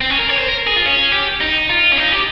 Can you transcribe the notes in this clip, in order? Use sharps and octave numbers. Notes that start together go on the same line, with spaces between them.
C4
C#4
A#4
C#5
C5
A#4
G#4
F4
C#4
G4
D#4
F4
C#4
D#4
G4